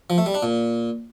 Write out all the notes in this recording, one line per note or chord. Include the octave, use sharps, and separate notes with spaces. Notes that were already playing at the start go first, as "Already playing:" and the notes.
F3
A3
G3
D4
A#2